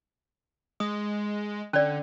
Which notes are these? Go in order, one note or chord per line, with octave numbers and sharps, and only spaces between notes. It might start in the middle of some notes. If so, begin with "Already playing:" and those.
G#3 D#6
D3 C#4 D5